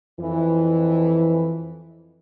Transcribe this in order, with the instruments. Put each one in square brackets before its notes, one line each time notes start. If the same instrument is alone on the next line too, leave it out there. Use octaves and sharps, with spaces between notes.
[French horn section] F2 E3